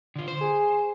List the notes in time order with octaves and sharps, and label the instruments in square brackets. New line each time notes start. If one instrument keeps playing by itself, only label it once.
[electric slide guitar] D3 F4
C5
[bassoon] G#4